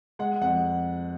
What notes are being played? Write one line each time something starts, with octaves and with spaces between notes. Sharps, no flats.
G#3 F#5
F2 F#5